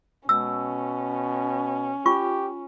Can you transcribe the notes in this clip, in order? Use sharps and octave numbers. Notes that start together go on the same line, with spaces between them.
B2 C#4 E6
F4 G4 C#6